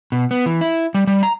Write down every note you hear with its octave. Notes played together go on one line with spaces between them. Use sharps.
B2
B3
E3
E4
G3
G3
A#5